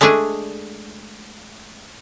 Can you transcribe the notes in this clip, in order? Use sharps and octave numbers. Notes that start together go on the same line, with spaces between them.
G#3 A3 D4 G#4